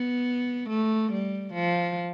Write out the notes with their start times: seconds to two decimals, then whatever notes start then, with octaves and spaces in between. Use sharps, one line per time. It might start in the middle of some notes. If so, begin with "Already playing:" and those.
Already playing: B3
0.69 A3
1.12 G3
1.54 F3